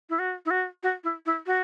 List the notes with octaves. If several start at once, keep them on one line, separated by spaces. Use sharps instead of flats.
E4
F#4
E4
F#4
F#4
E4
E4
F#4